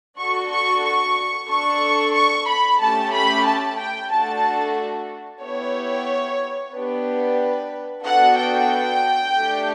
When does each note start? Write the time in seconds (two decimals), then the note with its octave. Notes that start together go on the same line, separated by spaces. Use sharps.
0.18 D4 F#4 A4 C#6
0.51 C#6
0.83 C#6
1.48 D4 A4 C#6
2.14 C#6
2.47 B5
2.80 A3 C#4 G4 A5
3.12 B5
3.45 A5
3.78 G5
4.11 A3 D4 F#4 A4 A5
5.42 B3 E4 G4 C#5
6.73 B3 D4 G4 B4
8.04 B3 D4 F#4 A4 F#5
8.37 G5
9.35 A3 D4 G4